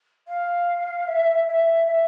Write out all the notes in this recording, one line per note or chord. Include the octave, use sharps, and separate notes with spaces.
F5
E5
E5
E5